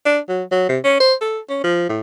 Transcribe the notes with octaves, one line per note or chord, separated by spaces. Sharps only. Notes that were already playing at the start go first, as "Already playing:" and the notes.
D4
F#3
F#3
C3
C#4
C5
A4
C#4
F3
A2